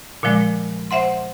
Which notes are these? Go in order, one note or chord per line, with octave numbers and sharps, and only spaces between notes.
A#2 D3 F3 G#3
C5 E5 F#5 C6